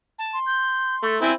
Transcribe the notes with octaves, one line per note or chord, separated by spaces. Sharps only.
A5
C6
G6
A3
C4 E4 G#5